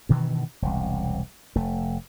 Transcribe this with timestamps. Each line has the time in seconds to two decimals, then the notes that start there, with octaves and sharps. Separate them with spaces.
0.09 G2 B2 D#3 E3
0.62 E1 C2
1.56 F1 A3